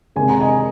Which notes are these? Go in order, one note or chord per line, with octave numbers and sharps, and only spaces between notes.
C3 D#3 G#3 G#5
A#5
D#5 G#5